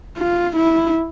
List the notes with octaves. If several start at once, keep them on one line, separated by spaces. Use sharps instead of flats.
F4
E4